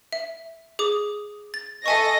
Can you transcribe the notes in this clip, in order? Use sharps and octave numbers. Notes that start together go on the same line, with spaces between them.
E5
G#4 D6 D#6
A6
A4 D#5 E5 G#5 C#6 A#6